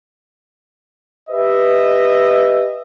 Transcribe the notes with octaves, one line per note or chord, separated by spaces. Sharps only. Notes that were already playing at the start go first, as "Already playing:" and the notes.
G4 B4 D#5 E5